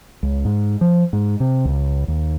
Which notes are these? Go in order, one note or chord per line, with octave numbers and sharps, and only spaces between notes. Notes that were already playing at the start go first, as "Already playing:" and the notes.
C#2
G#2
F3
G#2
C3
C#2
D#2